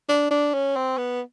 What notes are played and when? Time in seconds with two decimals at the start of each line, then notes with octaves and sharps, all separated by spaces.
0.09 D4
0.30 D4
0.54 C#4
0.76 C4
0.98 B3